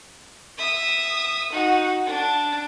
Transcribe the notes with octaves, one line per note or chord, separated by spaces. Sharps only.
E5 D#6
D#4 F#4
D4